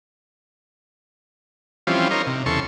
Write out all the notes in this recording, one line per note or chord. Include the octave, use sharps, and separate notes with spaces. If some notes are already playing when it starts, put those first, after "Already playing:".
E3 F3 G3 C4 C#4 F4
D#4 A#4 C5 C#5
C3
E2 C#3 A4 C6 C#6